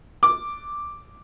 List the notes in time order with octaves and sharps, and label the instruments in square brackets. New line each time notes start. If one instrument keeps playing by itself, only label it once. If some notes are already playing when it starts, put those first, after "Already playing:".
[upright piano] D6